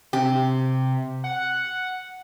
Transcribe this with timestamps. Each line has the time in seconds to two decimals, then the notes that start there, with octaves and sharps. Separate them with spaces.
0.13 C3 G4
1.24 F#5